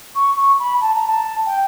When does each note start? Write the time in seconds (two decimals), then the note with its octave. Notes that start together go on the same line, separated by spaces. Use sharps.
0.15 C#6
0.37 C#6
0.60 B5
0.81 A5
0.94 A#5
1.08 A5
1.46 G5